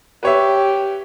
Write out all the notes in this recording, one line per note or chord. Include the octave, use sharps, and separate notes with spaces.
G4 B4 C#5 E5